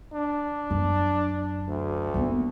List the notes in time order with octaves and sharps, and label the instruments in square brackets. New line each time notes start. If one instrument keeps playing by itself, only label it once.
[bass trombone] D4
[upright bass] F#2
[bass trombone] D2
[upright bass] D#2 B3